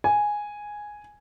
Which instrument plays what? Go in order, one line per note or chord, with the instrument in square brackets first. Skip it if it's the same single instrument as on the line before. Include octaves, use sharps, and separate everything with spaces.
[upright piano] G#5